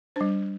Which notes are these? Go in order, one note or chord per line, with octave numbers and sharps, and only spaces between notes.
G3 D4 C5